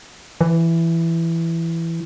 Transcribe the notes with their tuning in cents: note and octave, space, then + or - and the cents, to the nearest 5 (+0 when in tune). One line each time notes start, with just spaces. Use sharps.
E3 +10